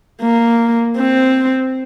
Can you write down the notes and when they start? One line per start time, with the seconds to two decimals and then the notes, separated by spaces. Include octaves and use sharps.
0.22 A#3
0.97 C4